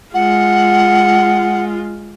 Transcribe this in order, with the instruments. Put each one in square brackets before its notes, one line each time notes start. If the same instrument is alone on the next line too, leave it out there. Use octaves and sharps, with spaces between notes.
[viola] G#3 F4 [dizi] F#5